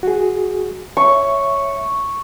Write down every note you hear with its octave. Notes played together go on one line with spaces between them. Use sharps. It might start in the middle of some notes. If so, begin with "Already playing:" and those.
F#4 G#4
C#5 E5 C#6